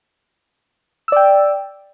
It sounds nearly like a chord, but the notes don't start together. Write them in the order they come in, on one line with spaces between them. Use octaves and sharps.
E6 D5 G5